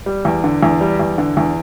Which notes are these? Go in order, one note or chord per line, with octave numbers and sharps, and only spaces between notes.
G3
E2
D3
E2
G3
E2
D3
E2